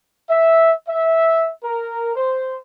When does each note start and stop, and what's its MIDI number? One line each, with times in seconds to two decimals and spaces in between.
0.29 0.73 76
0.88 1.51 76
1.64 2.15 70
2.16 2.58 72